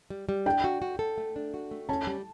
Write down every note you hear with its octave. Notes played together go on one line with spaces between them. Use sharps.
G3
G3
D4 G5
F#4
F#4
A4
A3
D4
F#4
A3
C#4 A5
G3